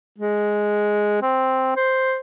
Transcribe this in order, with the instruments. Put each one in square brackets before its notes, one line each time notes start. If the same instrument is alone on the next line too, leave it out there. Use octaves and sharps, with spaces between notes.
[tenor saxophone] G#3
C4
C5